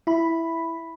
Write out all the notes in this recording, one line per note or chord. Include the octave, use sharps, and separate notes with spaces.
E4 B5